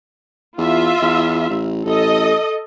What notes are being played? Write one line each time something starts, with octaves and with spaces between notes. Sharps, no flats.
E2 F4 E5
E2
A1
A1 A4 D#5